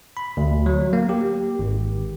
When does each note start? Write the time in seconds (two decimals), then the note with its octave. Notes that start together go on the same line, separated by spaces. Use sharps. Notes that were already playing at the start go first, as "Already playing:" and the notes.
0.17 B5
0.37 D2
0.66 F#3
0.93 A#3
1.09 G4
1.59 G#1